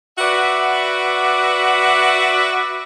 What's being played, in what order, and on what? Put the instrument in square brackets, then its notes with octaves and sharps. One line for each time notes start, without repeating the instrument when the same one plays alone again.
[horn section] F#4 B4 D5 E5 F#5